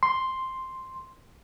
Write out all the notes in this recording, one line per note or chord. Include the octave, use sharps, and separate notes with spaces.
C6